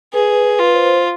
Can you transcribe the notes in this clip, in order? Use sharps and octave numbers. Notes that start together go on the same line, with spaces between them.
G#4 B4
B4
F4
B4
C5